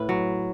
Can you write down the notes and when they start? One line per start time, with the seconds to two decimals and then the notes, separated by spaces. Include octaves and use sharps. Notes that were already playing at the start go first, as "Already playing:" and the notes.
Already playing: A2 B4
0.09 F#3